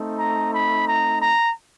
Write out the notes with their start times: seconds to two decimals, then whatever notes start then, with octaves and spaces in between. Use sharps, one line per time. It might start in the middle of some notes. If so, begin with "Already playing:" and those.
Already playing: A3 C4 D#4
0.18 A#5
0.53 B5
0.87 A#5
1.21 A#5